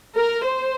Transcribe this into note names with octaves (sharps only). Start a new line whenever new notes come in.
A#4
C5